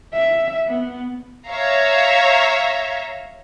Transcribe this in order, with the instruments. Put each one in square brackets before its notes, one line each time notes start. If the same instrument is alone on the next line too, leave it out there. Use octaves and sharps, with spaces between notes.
[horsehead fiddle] E5
B3
[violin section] C#5 E5 F5 A#5